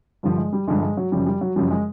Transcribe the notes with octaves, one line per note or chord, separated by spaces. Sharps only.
G2 D3 F3 G3
G#3
G3
G2 D3 F3 G#3
G#3
F#3
F#2 C#3 F3 G3
G3
F#3
F#2 C#3 F3 G3
G#3